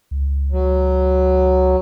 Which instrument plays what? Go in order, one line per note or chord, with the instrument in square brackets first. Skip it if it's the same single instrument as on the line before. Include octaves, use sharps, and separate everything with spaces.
[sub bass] C#2
[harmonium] F#3